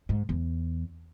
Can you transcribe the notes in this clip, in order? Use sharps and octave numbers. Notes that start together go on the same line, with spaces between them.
G#2
E2